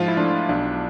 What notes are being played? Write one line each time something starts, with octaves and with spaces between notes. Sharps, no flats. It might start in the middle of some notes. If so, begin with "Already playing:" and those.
Already playing: G#2 F3 F4
E4
F3 A3 D4
B1 D4